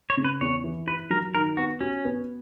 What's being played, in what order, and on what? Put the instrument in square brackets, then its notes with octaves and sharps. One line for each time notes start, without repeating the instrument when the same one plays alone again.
[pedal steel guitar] C#5
[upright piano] C#3
[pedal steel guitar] B4
[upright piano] E2 [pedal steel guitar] C#5
[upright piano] E3
[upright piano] E4 [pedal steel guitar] B4
[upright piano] F#3 [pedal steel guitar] A#4
[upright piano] D#3 [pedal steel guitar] A#4
[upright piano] B3 [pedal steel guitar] F#4
[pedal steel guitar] C#4 [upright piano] F#4
[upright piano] B3